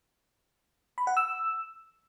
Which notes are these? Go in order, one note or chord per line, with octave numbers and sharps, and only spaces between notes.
B5
F#5
E6